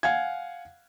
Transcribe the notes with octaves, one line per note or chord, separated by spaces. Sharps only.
F5 F#5 G#5 G#6